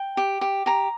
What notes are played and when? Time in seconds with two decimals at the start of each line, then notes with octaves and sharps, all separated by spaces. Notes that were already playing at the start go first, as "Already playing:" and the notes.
Already playing: G5
0.17 G4
0.41 G4
0.66 G4 A#5